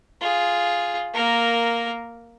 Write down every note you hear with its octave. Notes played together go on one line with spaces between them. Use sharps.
F4 G#4
A#3 A#4